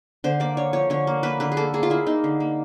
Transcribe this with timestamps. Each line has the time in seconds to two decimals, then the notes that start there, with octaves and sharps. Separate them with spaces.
0.24 D3 C5
0.40 A#3 D5
0.57 D3 C#5
0.73 F3 C#5
0.90 D3 C#5
1.07 A#3
1.23 A#3 B4
1.40 D3 B4
1.52 G#4
1.57 A#3 A4
1.73 A#3 G#4
1.83 F4
1.90 A#3 E4
2.06 A#3 D#4
2.24 D3
2.40 A#3